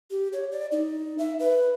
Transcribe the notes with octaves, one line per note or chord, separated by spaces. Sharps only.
G4
C#5
D5
D#4
E5
B4